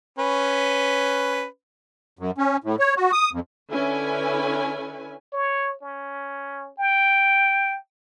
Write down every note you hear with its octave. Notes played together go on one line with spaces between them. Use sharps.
C#4 B4
F#2
C#4
A2
C#5
F#4
D#6
F2
D3 C#4 E4 B4 G#5
C#5
C#4
G5